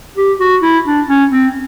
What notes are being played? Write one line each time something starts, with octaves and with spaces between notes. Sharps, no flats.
G4
F#4
E4
D4
C#4
C4